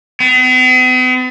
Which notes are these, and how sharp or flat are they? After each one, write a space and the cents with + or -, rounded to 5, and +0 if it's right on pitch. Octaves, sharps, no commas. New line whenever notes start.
B3 +45